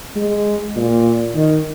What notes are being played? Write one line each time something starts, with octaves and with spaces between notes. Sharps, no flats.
G#3
A#2
D#3